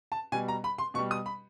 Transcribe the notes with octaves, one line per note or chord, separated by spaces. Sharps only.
A5
B2 G3 G#5
A#5
B5
C6
B2 G3 C#6
D#6
B5